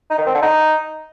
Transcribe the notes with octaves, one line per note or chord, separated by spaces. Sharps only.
D#4
D#3
C4
D3
D#4